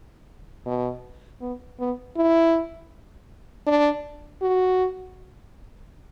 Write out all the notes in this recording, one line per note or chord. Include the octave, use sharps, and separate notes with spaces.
B2
B3
B3
E4
D4
F#4